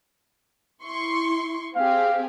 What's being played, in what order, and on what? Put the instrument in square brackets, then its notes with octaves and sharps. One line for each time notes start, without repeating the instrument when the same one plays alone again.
[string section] E4 C6 C#6
[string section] C4 G4 G#4 [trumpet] F5